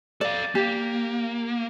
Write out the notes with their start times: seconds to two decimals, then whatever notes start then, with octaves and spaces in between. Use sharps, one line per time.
0.21 A4 D5 F5
0.55 A#3 G4